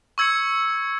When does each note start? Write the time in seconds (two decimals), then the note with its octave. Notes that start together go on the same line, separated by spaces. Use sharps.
0.18 C#6 E6 G#6 C#7